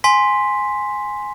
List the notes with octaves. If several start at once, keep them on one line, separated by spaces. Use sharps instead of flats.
G#5 C6 B6